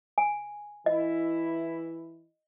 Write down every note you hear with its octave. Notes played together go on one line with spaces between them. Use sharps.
G#5
E3 E4 D#5